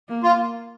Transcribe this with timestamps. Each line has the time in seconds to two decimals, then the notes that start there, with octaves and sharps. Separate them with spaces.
0.09 A#3
0.23 F4